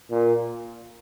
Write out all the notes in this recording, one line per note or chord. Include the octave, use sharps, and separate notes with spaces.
A#2